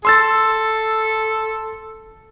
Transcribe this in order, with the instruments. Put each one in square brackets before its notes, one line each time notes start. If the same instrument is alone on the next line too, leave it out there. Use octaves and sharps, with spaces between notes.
[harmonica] A4 [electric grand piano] C6 E6 A6